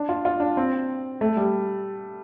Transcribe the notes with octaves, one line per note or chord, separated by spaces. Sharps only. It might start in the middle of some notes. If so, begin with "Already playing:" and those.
Already playing: D4
F4
F4
D4
C4
A3
G3